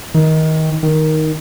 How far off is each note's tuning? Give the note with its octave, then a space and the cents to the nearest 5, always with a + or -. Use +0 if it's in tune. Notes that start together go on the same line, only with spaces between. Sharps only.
D#3 +20
D#3 +5